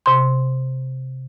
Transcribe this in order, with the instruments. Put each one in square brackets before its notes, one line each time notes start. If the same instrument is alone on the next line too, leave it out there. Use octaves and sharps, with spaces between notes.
[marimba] C3 C6